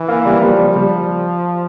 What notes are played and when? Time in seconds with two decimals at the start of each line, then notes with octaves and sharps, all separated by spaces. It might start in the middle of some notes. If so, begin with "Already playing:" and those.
Already playing: E3
0.08 A#3
0.25 G3
0.42 F3 G3
0.59 G3
0.76 G3